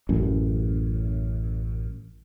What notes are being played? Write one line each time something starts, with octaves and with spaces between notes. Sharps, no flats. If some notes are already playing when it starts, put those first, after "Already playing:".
A1 F#2